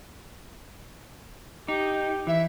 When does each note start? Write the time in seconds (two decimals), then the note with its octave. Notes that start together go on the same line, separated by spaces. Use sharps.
1.68 D#4 G4
2.27 E3 E5